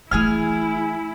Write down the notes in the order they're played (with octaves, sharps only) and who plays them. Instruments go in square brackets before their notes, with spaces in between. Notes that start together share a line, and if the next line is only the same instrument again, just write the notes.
[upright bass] E3 A3 [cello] E4 [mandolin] G#4 G#5 F6